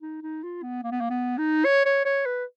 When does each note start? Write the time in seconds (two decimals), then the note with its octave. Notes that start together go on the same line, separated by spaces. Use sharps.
0.02 D#4
0.22 D#4
0.43 F4
0.63 B3
0.84 A#3
0.91 B3
1.01 A#3
1.10 B3
1.38 D#4
1.65 C#5
1.85 C#5
2.05 C#5
2.26 B4